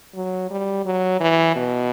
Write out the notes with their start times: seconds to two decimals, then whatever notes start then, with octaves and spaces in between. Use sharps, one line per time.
0.15 F#3
0.50 G3
0.85 F#3
1.20 E3
1.56 B2